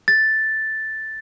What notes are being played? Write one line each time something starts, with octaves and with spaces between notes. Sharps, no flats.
A6